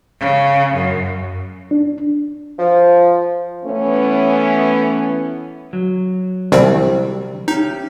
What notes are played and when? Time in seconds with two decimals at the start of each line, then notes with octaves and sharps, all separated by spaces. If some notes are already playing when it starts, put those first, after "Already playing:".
0.20 C#3
0.74 F#2
1.71 D4
2.59 F3
3.65 E3 A3 B3 C#4
5.73 F#3
6.52 C2 D#3 G3 C4
7.48 C#4 D#4 G4